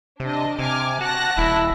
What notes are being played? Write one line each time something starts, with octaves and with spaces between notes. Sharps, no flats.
C3 D4 D#5
C3 G#5 D6 F6
F#4 A5 F#6 A#6
D#1 E4